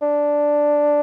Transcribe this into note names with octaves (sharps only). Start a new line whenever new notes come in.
D4